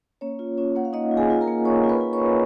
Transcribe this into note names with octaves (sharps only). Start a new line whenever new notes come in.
A#3 C#4 C#5
F4
C#4 F4 C#5
A#3 F#5
F5
A#3 D#4 D#5
F4
G#4 G#5
F4
A#4 A#5
A#3
A#3 C#5 C#6
F4
B4 B5
F4
C#5 C#6
A#3